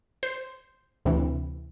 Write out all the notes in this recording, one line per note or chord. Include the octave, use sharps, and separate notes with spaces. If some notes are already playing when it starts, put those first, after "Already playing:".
C5
D2 C3 E3